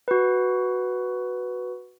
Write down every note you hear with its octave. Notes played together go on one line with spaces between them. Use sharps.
F#4 B4